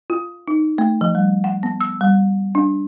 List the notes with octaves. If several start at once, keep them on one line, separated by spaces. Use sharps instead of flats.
F4
D#4
A3
F3
G3
F#5
B3
E6
G3
D4